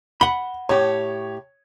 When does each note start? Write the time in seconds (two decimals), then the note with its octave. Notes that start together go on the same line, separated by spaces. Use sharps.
0.21 F#5 B5 G7
0.69 A2 G4 C#5